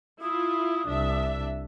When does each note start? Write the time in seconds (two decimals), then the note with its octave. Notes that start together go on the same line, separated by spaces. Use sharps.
0.21 E4 F4 D#6
0.87 C2 D4 E5